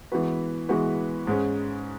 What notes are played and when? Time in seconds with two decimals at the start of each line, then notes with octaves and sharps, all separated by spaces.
0.12 E3 G#3 B3 F#4 B4
0.69 E3 G#3 B3 F#4 B4
1.27 G#2 G#3 C#4